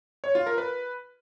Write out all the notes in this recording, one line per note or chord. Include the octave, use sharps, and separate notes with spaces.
C#5
F4
A#4
B4